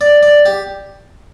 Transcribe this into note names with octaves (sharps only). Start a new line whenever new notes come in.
D5
D5
G4